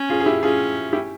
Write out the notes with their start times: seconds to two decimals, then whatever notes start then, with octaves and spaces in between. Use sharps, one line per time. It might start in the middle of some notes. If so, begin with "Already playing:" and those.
Already playing: C#4
0.10 F4 G#4
0.20 G#4
0.26 E4 G4
0.43 C#4 F4 G#4
0.93 E4 G4